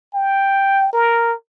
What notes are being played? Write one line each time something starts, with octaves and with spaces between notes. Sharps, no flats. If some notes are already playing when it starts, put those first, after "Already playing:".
G5
A#4